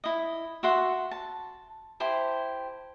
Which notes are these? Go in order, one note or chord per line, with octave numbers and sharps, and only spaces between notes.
E4 D#5
F#4 E5 F#5 C6
A5
E4 G4 C5 A5